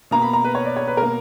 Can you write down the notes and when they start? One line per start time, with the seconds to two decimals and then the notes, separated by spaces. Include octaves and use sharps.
0.11 B2 A#3 A#5
0.22 B5
0.33 A#5
0.44 B4
0.55 C#5
0.66 D5
0.77 C#5
0.87 B4
0.97 B2 A#3 A#4